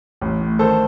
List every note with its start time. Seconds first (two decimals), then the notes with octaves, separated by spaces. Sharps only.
0.21 A1
0.41 A2
0.59 D#3 A4 C5